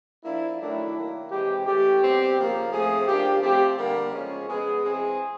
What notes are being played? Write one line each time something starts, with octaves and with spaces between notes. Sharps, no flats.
F3 A#3 D4 E4
D#3 F#3 A3 D4 E4
D#3 F#3 A#3
C3 E3 G#3 C4 G4
E3 A3 C#4 G4
B2 G3 C4
C#3 F3 A#3
A2 F3 A3 C4 G#4
C#3 F3 A#3 D4 G4
F3 A3 C4 G4
D3 G3 A#3
C#3 F3 G#3 C#4
B2 G#3 B3 G#4
E3 G#3 C4 G#4